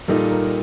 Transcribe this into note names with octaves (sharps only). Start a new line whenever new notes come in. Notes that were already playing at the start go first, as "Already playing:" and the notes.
A#2 G3 A#3 D#4 A4
A#4